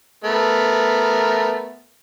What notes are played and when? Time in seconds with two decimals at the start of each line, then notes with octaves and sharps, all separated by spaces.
0.24 A3 B3 A#4